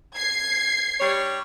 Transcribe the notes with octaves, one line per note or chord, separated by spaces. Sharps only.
G#6 C7
G3 D4 C#5